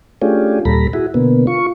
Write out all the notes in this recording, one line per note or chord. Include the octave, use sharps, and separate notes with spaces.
A3 C#4 D4 F4 G4 G#4
D#2 A#2 G3 A4 A#5 B5
E4 F#4 G#4
B2 D3 A#3 B3
F4 C#6